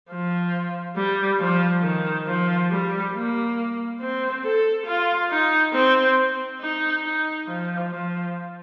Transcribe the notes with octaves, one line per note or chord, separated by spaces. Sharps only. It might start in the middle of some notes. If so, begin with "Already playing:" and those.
F3
G3
F3
D#3
F3
G3
A#3
C4
A4
F4
D#4
C4
D#4
D#4
F3
F3